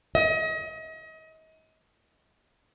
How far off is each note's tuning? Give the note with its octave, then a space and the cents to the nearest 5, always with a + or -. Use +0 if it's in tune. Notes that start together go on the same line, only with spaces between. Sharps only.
D#5 +35